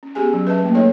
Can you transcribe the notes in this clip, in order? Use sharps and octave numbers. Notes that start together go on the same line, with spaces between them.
C#4
B3 G4 G#4 G#5
F#3 C#4
B4 D#5 E5 A5
A3 A#3
D#4 A4 C#5 D#5